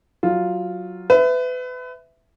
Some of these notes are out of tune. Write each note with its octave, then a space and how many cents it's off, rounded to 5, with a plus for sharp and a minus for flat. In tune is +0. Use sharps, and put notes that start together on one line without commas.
F#3 +0 F4 +0
B4 +30 E5 +0